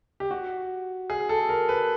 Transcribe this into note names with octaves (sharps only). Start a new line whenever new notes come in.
G4
F#4
G#4
A4
A#4
B4